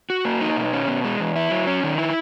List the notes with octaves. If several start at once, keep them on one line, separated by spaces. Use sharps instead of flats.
F#4
A#3
D#4
B2
C#4
B2
G#3
E2
E4
F#3
C#4
D#3
E4